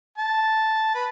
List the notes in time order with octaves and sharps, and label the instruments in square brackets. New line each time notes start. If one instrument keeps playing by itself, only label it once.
[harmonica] A5
B4